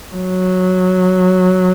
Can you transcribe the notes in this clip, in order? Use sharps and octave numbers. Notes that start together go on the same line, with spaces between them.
F#3